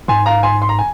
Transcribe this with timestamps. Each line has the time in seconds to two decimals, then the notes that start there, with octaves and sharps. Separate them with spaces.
0.08 G#2 G#5 C6
0.26 F5 A#5
0.43 G#5 C6
0.62 C6
0.69 A#5
0.79 G#5